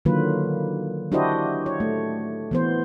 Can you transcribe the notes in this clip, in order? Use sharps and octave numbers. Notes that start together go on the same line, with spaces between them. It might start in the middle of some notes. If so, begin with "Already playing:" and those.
D3 D#3 F#3 A#3 F4 B4
D4 E4 F#4 G4 C5 D#5
C#5
A3
E3 B3 C5